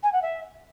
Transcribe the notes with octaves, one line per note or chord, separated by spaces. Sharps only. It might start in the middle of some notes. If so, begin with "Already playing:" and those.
G#5
F#5
E5